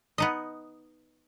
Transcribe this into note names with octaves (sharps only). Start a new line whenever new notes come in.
B3 D#4 D#5